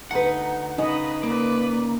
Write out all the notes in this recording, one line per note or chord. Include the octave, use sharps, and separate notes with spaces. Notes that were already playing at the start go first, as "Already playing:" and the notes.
D2 D#4 B4 F#5
C#3 D#4 B4 D#5 B5
A#3 B4 D5